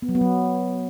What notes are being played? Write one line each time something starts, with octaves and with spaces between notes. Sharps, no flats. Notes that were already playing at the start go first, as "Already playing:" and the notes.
B3
F#3
B3
F#3